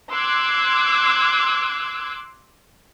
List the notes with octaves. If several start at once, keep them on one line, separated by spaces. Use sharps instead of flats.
C6 D6 E6 F#6 G#6